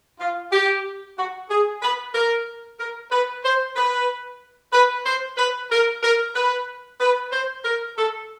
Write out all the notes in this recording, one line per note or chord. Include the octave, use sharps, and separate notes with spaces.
F4
G4
F#4
G#4
B4
A#4
A#4
B4
C5
B4
B4
C5
B4
A#4
A#4
B4
B4
C5
A#4
A4